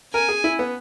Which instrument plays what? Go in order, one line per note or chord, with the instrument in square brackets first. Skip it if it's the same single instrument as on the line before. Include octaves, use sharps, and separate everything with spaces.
[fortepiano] A#4 [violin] G#5
[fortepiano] G#4
E4
B3